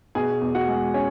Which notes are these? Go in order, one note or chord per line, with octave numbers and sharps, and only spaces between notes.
B2 G#4 G#5
E2
F#4 F#5
G#3
C#4 C#5